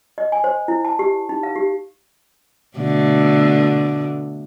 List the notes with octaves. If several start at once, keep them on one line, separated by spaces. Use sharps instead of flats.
D#5
G#5
C5
E4
A5
G4
D#4
F5
G4
B2 D3 A3